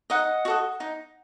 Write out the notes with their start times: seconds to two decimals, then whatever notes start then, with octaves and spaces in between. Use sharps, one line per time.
0.10 D#4 D#5 F#5
0.45 F#4 A4 D#5
0.80 D#4